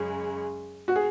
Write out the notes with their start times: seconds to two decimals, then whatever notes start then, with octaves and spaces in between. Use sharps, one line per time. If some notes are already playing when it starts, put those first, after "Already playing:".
Already playing: F#2 C#3 G#3
0.88 F#4
0.96 G#4